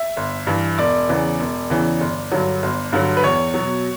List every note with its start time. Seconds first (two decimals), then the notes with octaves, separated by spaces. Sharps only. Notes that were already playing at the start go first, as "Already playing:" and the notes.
Already playing: E5
0.17 G1
0.47 G2 E3
0.78 E1 D5
1.09 E2 C#3 E3
1.40 E1
1.70 E2 C#3 E3
2.01 G1
2.32 G2 D3 F#3
2.63 G1
2.93 G2 D3 F#3
3.17 B4
3.23 E2 C#5
3.54 B2 F#3